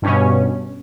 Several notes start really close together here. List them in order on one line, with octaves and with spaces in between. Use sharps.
G2 C#4 B2